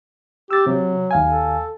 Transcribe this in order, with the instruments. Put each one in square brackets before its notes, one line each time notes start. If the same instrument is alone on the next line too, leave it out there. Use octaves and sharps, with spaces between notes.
[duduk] G4 [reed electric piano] E6 A6
[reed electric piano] C3 [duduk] F#3
[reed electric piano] D#2 F5 G#5
[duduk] A4